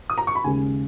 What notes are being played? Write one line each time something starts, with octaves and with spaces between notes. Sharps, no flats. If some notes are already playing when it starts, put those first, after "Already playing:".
D#6
A#5
C#6
B5
D#2 C#3 G#3 C#4 G#5